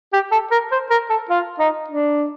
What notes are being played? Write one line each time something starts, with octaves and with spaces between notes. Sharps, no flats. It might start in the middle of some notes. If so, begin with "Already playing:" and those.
G4
A4
A#4
C5
A#4
A4
F4
D#4
D4